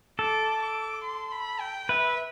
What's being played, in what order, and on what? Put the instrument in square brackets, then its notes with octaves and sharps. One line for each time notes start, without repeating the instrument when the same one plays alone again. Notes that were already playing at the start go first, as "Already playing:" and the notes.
[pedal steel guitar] A4 [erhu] D6
[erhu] D6
C6
B5
G5
[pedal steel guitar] B4 [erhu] E5